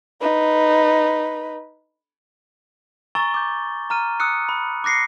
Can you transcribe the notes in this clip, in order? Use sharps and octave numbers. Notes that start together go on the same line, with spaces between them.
D#4 B4
G#5 A#5 C#6 E6 A6 G7
D6 G6
A#5 F6 D#7
D#6 E6 F#6 C#7
B5
D6 F#6 A#6 C7 C#7